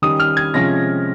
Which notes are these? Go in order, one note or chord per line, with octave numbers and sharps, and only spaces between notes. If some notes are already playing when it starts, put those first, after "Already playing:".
D#3 G3 C#4 D#6
F6
G#6
C3 F3 G#3 C#4 A#6